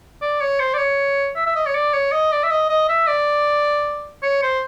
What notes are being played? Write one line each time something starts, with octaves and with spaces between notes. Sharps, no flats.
D5
C#5
C5
D5
C#5
E5
E5
D#5
C#5
D5
C#5
D#5
D5
E5
D#5
D#5
E5
D5
C#5
C5